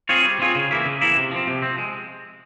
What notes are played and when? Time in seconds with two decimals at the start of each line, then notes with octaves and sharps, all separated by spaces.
0.09 C4 F4 G#4 C#5
0.25 G3
0.40 C4 F4 G#4 C#5
0.55 C#3
0.71 E3 A#3 E4
0.85 C#3
1.01 E3 A#3 E4
1.17 C3
1.31 F3 C4
1.47 C3
1.62 F3 C4
1.78 G#3